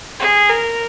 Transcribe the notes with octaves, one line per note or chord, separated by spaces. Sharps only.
G#4
A#4